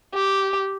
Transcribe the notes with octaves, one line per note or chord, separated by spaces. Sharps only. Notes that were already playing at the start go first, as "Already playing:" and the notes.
G4